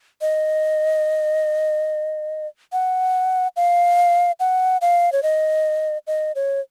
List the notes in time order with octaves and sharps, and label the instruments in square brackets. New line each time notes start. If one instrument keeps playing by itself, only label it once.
[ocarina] D#5
F#5
F5
F#5
F5
C#5
D#5
D#5
C#5